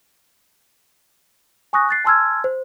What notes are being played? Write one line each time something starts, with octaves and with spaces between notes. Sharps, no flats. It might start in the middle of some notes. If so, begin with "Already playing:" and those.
G#5 C#6 D#6 F#6 A#6
F#6 A6 C7
G#5 A5 C6 E6 F6 G#6
C5